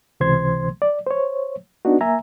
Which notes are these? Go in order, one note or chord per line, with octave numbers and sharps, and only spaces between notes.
C#2 C3 E3 C5 C6 G#6
D5
C5 C#5
B3 D4 D#4 F#4
A#3 E5 G#5 A#5